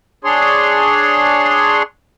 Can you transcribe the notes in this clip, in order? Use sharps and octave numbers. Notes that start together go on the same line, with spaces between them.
D4 G#4 C#5 C6